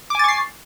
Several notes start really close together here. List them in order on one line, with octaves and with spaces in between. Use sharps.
D6 G#5 A6 C#6 C7